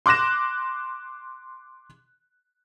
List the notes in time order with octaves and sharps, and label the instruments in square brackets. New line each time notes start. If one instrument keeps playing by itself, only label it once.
[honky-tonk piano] C6 D6 F#6 A#6 E7